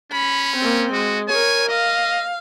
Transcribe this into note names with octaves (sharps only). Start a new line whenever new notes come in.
C#4 B5
A#3 C4
G#3 F#4
A#4 C#5 G#5
D#5 F5